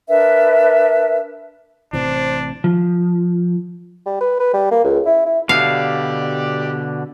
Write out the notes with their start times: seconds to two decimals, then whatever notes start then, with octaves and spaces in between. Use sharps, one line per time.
0.08 D4 A#4 B4 E5
1.93 A1 C3 E3 D4 C5
2.64 F3
4.06 G3
4.21 B4
4.40 B4
4.54 G3
4.71 A#3
4.84 C#2
5.06 E4
5.26 E4
5.49 B2 D3 G4 D5 F5